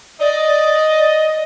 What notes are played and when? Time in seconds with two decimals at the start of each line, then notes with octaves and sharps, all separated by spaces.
0.20 D5 D#5